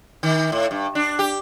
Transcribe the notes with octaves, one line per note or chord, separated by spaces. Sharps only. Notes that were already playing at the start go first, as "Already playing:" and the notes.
D#3
A2
G2
D4
G4